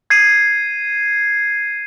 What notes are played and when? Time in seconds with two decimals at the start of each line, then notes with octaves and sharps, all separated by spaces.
0.10 G#6 C7 D#7